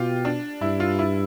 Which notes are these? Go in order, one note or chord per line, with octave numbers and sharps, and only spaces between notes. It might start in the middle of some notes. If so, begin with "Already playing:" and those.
Already playing: B2 F4 G4
D4
G2 E4
F4
E4